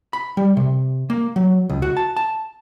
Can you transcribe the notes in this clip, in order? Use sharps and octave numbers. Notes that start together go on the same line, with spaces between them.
B5
G3
C3
A#3
F#3
C#2
F#4
A5
A5